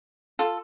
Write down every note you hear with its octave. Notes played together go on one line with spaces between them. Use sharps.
F4 A4